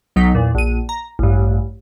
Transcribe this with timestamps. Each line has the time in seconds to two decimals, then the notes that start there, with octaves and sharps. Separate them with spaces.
0.16 B1 F#3 D#4 B6
0.35 E2 A#2
0.55 A#1 D#7
0.89 A#5
1.19 A1 G2